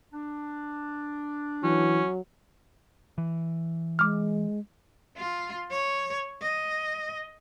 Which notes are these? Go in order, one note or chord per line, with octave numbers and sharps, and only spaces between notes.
D4
E3 F#3 C#4
E3
G#3 D6 F6
F4
C#5
D#5